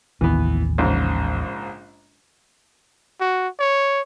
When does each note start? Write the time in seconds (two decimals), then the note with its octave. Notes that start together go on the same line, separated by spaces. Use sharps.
0.21 A1 D#2 E3 B3
0.78 A#1 G#2 C#3
3.20 F#4
3.59 C#5